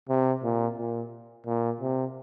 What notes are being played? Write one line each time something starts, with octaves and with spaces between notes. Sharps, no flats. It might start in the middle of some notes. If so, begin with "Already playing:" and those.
C3
A#2
A#2
A#2
C3